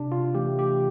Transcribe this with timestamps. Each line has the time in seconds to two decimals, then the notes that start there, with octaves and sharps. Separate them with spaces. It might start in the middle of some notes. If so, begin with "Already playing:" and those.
Already playing: C3 D4
0.12 F4
0.35 E3 A3 G4
0.59 G4